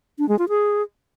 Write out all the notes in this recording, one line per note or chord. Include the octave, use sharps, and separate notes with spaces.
D4
G#3
F4
G#4